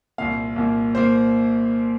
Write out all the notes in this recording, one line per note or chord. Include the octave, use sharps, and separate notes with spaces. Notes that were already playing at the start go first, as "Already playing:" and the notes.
C2 A#2 A#3 F5
C2 A#2 A#3
A#2 A#3 C5